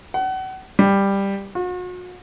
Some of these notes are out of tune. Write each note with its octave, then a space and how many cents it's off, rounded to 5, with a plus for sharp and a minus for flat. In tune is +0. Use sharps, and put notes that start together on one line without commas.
F#5 +35
G3 +10
F#4 -40